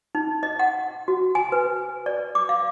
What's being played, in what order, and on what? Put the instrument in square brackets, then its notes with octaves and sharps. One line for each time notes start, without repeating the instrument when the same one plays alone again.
[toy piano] D#4
D#5
F#5
F#4
G#5
B4
D5
D6
F5